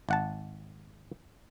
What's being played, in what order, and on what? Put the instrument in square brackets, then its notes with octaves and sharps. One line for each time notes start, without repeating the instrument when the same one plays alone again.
[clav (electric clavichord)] G#1 F#5 A5